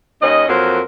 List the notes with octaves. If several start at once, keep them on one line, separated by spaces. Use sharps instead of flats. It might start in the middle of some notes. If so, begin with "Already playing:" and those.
D#2 C#4 D#5
F2 F#3 A#3 A#4 C5